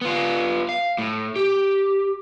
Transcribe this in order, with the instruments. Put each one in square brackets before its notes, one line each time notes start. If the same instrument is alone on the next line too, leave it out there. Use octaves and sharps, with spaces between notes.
[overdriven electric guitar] B3 F4
F5
A2
G4